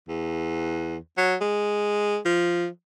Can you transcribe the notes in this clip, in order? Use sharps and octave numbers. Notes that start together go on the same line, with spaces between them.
E2
F#3
G#3
F3